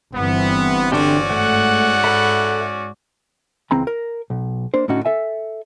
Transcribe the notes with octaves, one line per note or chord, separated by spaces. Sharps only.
G1 E3 B3 C4
D3 C#4 D4 F#4 G4 D5
G#2 A3 F#5
A4 E5 B5
C#2 E3 C4 A#5 B5
A#4
B1
A#3 D4 C5
A2 D3 C#4 D#4 F#4
A4 E5 G#5